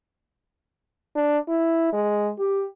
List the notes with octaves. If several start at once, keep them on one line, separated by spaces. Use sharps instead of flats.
D4
E4
G#3
G4